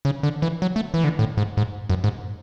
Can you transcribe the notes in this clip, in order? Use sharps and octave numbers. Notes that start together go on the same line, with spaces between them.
C#3
D3
E3
F#3
A3
E3
D3
A2
G#2
G#2
F#2
G#2